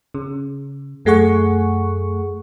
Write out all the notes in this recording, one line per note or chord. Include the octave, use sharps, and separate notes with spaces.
C#3
F#2 A3 G#4 F#5 C#6